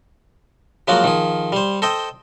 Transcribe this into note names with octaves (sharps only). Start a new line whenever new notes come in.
F3 F#3 G#3 A#3 F4 F#4
D#3 F3 G#4
G3 C5
A4 C5 D#5 G5